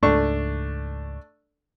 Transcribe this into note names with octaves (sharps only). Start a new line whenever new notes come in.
C#2 G#2 A3 D4 C#6